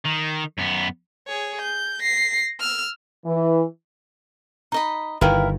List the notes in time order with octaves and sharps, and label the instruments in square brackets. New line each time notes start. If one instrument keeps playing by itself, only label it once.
[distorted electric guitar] D#3
F#2 B3
[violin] G#4 C#5
G6
A#6 C7
E6 F6
[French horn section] E3
[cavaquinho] D#4 D#5 B5 [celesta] A#5
[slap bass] G1 D#3 [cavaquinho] E4 A#4 [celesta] B4 F5 G5